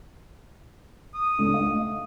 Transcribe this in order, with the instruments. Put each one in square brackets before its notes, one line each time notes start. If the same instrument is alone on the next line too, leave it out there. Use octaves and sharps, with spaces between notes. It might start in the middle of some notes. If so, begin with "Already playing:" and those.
[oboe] D#6
[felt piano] C#2 D4 A4
D#5 F5
A3